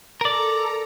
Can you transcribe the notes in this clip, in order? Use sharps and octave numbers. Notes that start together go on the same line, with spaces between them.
A4 A#4 D5 A#5